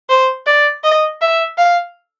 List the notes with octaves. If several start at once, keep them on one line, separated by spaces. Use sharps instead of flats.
C5
D5
D#5
E5
F5